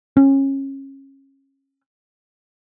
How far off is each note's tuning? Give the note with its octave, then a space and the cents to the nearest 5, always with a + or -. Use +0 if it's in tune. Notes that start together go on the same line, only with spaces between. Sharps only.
C#4 -25